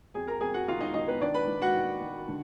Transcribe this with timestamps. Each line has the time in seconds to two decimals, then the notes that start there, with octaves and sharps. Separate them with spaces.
0.14 F2 G#4 G#5
0.27 A#4 A#5
0.41 F2 G#4 G#5
0.54 F#4 F#5
0.68 D#3 F4 F5
0.81 D#4 D#5
0.94 D#3 D#4 D#5
1.08 B3 B4
1.21 D#3 D4 D5
1.34 B4 B5
1.47 D#3
1.62 F#4 F#5
1.75 D#3
2.01 D#3
2.28 D3